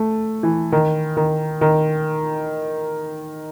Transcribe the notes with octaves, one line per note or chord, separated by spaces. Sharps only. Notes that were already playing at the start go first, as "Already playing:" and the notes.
Already playing: A3
E3
D#3
D#3
D#3